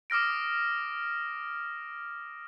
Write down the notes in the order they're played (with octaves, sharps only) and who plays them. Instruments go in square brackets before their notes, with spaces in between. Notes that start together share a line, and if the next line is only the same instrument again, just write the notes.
[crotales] D6 D#6 F6 A#6 D7